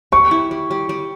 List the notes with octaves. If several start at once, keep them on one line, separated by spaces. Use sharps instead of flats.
G3 C#6
E4
G3
G3
G3